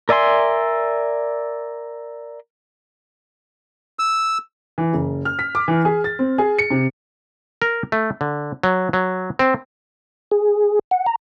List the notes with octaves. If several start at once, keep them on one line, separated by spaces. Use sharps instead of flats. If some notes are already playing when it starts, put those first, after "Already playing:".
A#4 D5 E5 G#5 C6
E6
E3
F#1
F6
B6
D6
E3
G#4
A6
C4
G#4
C#7
C3
A#4
A3
D3
F#3
F#3
C4
G#4
F#5
A#5